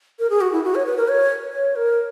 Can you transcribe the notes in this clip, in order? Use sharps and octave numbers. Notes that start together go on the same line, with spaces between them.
A#4
G#4
F#4
E4
F#4
C#5
B4
A#4
C#5
C#5
A#4